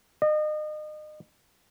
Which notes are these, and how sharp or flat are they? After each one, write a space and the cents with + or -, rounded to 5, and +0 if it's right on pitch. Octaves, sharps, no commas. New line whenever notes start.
D#5 -35